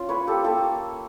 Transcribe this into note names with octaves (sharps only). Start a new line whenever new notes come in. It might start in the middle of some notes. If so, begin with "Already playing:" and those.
Already playing: C#4 F4
A#3 B4 C#5
A#3 G4 A4
A#3 G4 A4